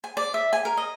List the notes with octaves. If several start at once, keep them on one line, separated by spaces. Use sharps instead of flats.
G#5
D5
E5
G#5
A#4
D#5